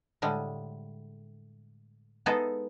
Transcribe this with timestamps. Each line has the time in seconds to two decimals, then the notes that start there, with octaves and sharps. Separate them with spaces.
0.22 A2 D3 G3 G#3
2.26 G#3 B3 D#4 E4 G#4 A4